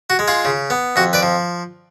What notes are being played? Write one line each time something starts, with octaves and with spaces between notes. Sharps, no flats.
F#4
G#3
F4 G#4
C#3
B3
F2 F#4
B4 D5
F3